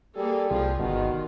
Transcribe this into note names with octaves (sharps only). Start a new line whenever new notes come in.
G3 A#3 G#4 A4
C2 F3 F4 G#4
G1 B2 D#3 F4